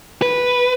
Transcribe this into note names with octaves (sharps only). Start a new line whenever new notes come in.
B4